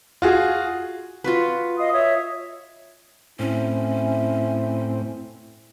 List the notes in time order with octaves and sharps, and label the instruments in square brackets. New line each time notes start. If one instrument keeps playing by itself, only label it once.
[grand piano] F4 F#4 G#4
[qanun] F4 F#4 B4
[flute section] D#5 F5 D#6
C#5 E5 D#6
[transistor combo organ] A2 C4 [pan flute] C#4 [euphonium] E4